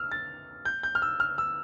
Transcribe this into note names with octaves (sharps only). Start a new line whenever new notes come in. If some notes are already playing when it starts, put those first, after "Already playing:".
Already playing: E6 F6
A6
G6
G6
F6
E6
F6
E6